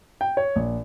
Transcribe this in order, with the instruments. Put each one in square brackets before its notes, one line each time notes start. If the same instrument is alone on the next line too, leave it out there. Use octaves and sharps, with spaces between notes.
[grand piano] G5
C#5
A#1